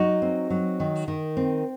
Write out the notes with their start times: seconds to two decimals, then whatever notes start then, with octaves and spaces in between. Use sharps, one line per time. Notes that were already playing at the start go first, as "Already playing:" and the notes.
Already playing: F#3 D#4 F#4
0.22 C4
0.50 F#3
0.80 D#3
1.08 D#3
1.37 C4